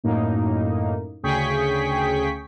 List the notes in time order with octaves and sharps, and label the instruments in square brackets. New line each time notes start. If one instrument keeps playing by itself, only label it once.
[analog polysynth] F#2 A2 A#3 D#4
D2 C#3 G#4 G5 C#6 B6